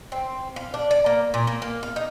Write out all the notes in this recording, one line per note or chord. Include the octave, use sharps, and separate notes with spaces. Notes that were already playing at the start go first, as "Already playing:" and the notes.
C4
F5
D4
D5
A#3
A#2
A#3
A#3
F5
D#4